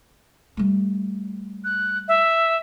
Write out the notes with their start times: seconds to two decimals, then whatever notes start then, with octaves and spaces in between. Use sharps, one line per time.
0.57 G3 A3
1.64 F#6
2.08 E5